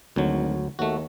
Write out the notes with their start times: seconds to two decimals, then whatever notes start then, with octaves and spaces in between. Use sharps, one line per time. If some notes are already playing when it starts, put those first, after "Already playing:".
0.16 G#1 D2 F#3
0.79 D#2 A3 F#4